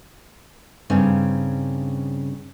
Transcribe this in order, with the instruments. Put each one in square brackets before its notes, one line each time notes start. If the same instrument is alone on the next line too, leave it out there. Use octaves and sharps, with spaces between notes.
[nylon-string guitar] G2 C#3 C4 C#4 D#4